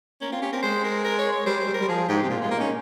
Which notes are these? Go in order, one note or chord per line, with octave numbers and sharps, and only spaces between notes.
A#3 C#4
C4 F4
C#4 G4
C4 A#4
G#3 C5
A#4
A#4
C#5
C#5
G3 C5
C5
G3
A#4
G3
F3 G#4
G#2 G4
C3
A#2 F4
G#3 F4
A#3
C#4 D#4